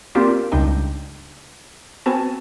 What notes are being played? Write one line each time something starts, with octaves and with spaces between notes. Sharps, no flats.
A#3 C4 D4 F4 G4 C5
C#2 G2 D4 D#4 G5
B3 C4 F#4 G#5 A5